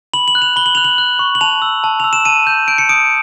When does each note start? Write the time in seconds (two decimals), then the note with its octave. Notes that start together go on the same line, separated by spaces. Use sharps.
0.14 B5 F#7
0.28 F#7
0.35 F#6
0.42 F7
0.56 B5 G7
0.66 F#7
0.75 F#6 F7
0.84 F#7
0.98 F#6
1.19 C#6
1.35 F#7
1.41 A5 F7
1.62 E6
1.84 A5
2.00 E6 F7
2.13 E7
2.25 A5 D#7
2.47 G6
2.68 G6 D7
2.78 C#7
2.89 D#6 D7